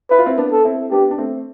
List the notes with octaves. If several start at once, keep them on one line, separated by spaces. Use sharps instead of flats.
E4 B4
F4
C4 E4
B3 D4
A4
C4 E4
B3 D4 G4
D4
A3 C4